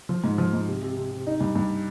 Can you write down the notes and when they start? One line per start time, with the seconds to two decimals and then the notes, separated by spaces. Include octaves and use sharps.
0.09 F3
0.24 G#2
0.38 F3
0.53 G#2
0.68 C3
0.83 C3
0.97 C3
1.12 C3
1.27 D#4
1.41 G2
1.55 G2